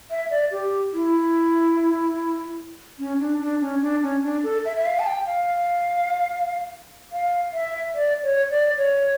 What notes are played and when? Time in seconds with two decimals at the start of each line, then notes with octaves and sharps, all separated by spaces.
0.11 E5
0.31 D5
0.52 G4
0.93 E4
2.99 C#4
3.20 D4
3.41 D4
3.61 C#4
3.81 D4
4.02 C#4
4.23 D4
4.44 A4
4.65 E5
4.76 E5
4.86 F5
4.99 A5
5.06 G5
5.26 F5
7.12 F5
7.53 E5
7.95 D5
8.23 C#5
8.51 D5
8.77 C#5